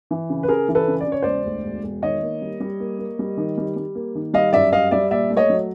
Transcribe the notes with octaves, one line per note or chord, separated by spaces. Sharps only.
E3
C#3
B4
C#3 G#4 A#4
E3
A4 B4
C#3
D5
C#3
C#5
E1 C5 D5
D2
E1
E1
D#3 C#5 D#5
A#3
G3
G3
A#3
A#3
G3
D#3
G3
G3
A#3
D#3
G3 D#5 F5
F#2 D5 E5
G3 D#5 F5
G3 D5 E5
A#2 D5 E5
A3
C#5 D#5
F#3